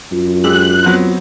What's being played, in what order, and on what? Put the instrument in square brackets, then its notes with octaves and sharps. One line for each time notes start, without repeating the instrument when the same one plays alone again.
[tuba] F#2 [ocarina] F4
[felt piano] G#3 G4 E6 [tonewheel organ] F#6
[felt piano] F#3 B3 C4